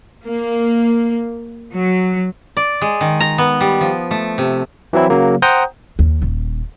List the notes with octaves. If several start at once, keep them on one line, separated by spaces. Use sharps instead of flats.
A#3
F#3
D5
G#3
D#3
A#5
B3
G3
F3
A3
C3
E3 F#3 C4 E4
C#3 F#3 A#3
C5 F#5 G5 A#5 D#6 G6
D#2
D#1